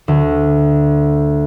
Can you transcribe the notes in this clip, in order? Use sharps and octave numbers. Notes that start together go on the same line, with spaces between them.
D2